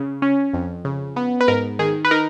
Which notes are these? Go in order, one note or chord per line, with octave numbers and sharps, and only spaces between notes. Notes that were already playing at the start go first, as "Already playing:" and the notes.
Already playing: C#3
C#4
F2
C#3
B3
B4
G#2 A#4
D#3 G#4
B4
D#4 A#4